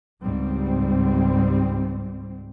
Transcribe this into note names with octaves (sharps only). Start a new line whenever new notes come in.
C#2 G#2 G3 C4